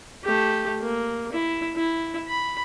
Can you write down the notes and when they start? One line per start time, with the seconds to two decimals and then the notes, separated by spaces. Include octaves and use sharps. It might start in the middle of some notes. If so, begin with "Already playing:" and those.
0.24 A3 G4
0.81 A#3
1.32 E4
1.76 E4
2.28 B5